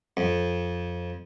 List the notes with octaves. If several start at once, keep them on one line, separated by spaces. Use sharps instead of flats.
F2